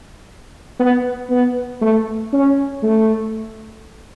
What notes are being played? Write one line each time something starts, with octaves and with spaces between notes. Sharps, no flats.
B3
B3
A3
C#4
A3